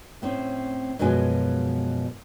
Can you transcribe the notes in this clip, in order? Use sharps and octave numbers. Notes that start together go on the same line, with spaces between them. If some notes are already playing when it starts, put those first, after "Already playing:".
A2 C4 C#4
F#2 B2 F3 G#3 G#5